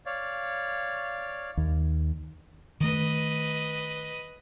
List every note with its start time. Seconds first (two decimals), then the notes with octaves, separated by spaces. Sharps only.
0.06 C#5 D5 F5
1.57 D#2
2.81 D#3 A3 B4 D#5